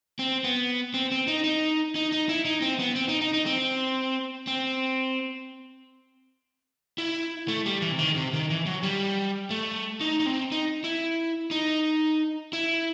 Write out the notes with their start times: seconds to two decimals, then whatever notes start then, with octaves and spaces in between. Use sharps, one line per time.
0.19 C4
0.44 B3
0.94 C4
1.11 C4
1.27 D#4
1.44 D#4
1.95 D#4
2.12 D#4
2.29 E4
2.45 D#4
2.62 C4
2.79 B3
2.96 C4
3.09 D#4
3.21 D#4
3.34 D#4
3.46 C4
4.47 C4
6.98 E4
7.48 A3
7.66 G3
7.82 E3
7.92 C3
7.99 D#3
8.16 C3
8.33 D#3
8.50 E3
8.66 F#3
8.83 G3
9.50 A3
10.01 D#4
10.20 D#4
10.26 C4
10.52 D#4
10.84 E4
11.51 D#4
12.53 E4